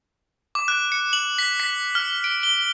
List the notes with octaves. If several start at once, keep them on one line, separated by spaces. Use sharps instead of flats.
D6
F#6
C#7
F#7
B6
B6
F6
D7
G7